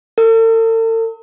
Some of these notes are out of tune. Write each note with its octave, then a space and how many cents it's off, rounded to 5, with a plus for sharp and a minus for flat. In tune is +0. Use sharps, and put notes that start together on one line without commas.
A4 +45